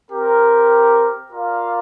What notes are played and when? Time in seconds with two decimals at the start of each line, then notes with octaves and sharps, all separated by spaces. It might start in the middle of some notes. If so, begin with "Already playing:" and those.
0.11 C4 G4 A#4
1.31 F4 A#4 D5 F5